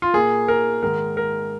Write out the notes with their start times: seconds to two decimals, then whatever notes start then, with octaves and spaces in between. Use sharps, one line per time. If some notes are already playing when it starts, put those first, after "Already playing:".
0.02 F4
0.14 A#2 A#3 G#4
0.48 A#4
0.83 G#2 D#3 G#3 A#4
1.17 A#4